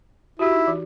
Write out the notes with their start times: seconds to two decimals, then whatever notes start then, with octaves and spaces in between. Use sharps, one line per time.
0.39 E4 F#4 G4
0.53 D#4
0.67 E3